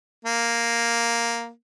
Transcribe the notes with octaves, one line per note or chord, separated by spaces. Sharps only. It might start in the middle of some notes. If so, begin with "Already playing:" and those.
A#3